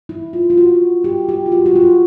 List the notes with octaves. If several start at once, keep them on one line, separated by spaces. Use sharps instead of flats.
E4
F4
F4
F#4
G4
G4
F4
F#4
F#4
F4